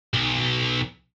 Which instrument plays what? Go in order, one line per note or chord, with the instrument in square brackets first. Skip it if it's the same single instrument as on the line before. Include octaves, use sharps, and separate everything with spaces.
[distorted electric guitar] B1